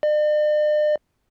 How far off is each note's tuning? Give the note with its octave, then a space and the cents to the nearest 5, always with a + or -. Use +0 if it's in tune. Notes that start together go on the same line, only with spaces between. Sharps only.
D5 +45